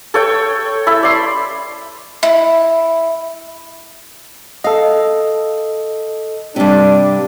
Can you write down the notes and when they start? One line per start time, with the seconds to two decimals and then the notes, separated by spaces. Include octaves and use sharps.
0.14 A4 C#5 G5
0.87 E4 A4 E5
1.03 D5 C6
2.23 E4
4.64 A4 D#5 F5
6.56 G2 C3 D4